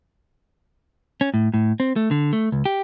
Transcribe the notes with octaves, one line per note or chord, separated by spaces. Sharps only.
C#4
A2
A2
C4
A3
D3
A3
C#2
G4